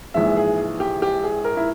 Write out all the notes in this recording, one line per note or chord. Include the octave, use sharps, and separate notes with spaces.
A#1 G#2 E3 G#3 E5
G#4
G4
G4
G#4
A#4
E4